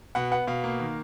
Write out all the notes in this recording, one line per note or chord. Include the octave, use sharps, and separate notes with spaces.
B2 F#5
B3 F#5
B2 F5
A#3
D#3